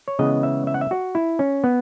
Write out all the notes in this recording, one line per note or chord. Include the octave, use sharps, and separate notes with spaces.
C#5
C#3 E3 G#3 B3 D#5
E5
E5
F#5
E5
F#4
E4
C#4
B3